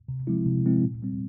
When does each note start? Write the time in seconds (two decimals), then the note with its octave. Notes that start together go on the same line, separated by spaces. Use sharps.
0.08 C3
0.27 F3 G#3 C4 E4
0.46 C3
0.65 F3 G#3 C4 E4
0.83 A#2
1.02 G3 C4